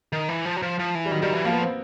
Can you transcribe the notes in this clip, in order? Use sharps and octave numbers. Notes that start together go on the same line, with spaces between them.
D#3
E3
F3
F#3
F3
F3
E3
G3
D#3 F#3
D#3 G3
E3
F3 A#3
B3
C4